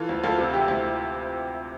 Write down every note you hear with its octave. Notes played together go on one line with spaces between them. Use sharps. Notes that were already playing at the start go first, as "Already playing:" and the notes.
Already playing: E3 F4 A4
D2
D2 F4 A4
C3 F4
E3 E4 G4
D2